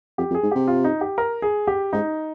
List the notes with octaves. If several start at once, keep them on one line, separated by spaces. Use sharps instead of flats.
F2 G4
F2
G#4
G#2
C3 G4
F4
D#4
G4
A#4
G#4
G4
G#2 D#4